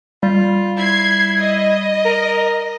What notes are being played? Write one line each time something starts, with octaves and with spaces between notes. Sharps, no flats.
G3 F4
E4 G#6 C7
D#5
A#4